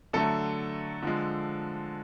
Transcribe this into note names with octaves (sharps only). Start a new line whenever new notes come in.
D3 F#3 A3 A4
D3 F3 G#3